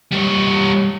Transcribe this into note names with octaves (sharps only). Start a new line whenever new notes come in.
G3 C#5